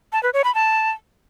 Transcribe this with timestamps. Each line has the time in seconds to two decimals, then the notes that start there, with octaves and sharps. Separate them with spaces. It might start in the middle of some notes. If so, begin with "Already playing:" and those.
0.12 A5
0.23 B4
0.34 C#5
0.44 B5
0.55 A5